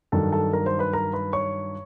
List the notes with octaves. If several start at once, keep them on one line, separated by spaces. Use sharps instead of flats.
G2 D#3 F#3 A4 A5
A4 A5
A#4 A#5
C5 C6
B4 B5
A#4 A#5
B4 B5
C#5 C#6